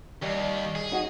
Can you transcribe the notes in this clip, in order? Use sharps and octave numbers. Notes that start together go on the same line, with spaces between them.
D#2 G3
G#4
D#4 F#4